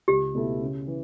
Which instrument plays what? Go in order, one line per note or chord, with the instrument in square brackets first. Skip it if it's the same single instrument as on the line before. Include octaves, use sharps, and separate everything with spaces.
[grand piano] C#2 [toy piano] G4
[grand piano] B2 A3 E4 A4
C#3
E3